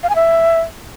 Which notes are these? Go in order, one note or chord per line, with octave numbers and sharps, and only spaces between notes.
F5
G#5
E5